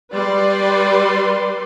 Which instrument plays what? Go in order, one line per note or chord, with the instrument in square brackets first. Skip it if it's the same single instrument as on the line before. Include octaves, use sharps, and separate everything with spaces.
[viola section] G3 B4 D5 C6